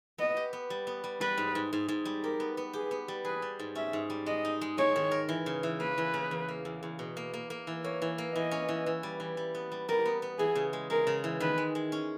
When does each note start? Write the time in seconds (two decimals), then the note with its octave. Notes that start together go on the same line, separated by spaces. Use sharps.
0.18 B3 D#5
0.37 G4
0.53 B3
0.70 G3
0.87 B3
1.04 G3
1.21 G3 B4
1.38 G#2
1.55 G#2
1.73 G#2
1.88 G#2
2.05 G3
2.23 G4 A#4
2.40 B3
2.57 B3
2.73 G4 G#4
2.91 B3
3.08 G3
3.25 G#4 B4
3.42 G3
3.59 G#2
3.75 C#4 E5
3.93 G#2
4.10 G3
4.26 G#3 D#5
4.45 D#4
4.61 G#3
4.78 G#3 C#5
4.96 D#3
5.11 A#4
5.29 E3
5.46 C#3
5.63 E3
5.80 A#3 B4
5.98 E3
6.14 C#3
6.31 E2
6.48 A#3
6.65 E2
6.83 E2
6.99 B2
7.17 A#3
7.34 A#3
7.50 A#3
7.67 E3
7.84 A#3 C#5
8.02 E3
8.18 A#3
8.34 E3 D#5
8.51 C#4
8.69 E3
8.86 E3
9.03 G3
9.20 E3
9.37 G3
9.55 B3
9.72 G3
9.89 G3 A#4
10.05 B3
10.22 B3
10.39 E3 G#4
10.55 C#3
10.73 G#3
10.90 G#3 A#4
11.07 C#3
11.24 E3
11.40 D#3 B4
11.58 G#3
11.75 G#3
11.92 C#4